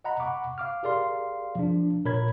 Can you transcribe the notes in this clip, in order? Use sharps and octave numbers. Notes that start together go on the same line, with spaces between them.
D#5 F#5 A#5 B5
F#5 B5 C#6 D6
F5 D6 F6
G4 G#4 A#4 D5 F5 C6
F3 D4
A#2 A#4 C#5 B5 G#6